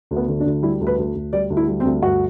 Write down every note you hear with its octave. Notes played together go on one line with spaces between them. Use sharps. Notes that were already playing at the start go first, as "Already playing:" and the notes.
D2
B3
D3
D4
D2
G3 E4
D2
B4
D2
D2
G3 D5
D2
E4
G3
C4
D2
G2 F#4